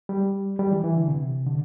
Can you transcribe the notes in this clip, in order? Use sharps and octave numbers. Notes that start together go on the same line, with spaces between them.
G3
G3
E3
E3
D3
C3
D3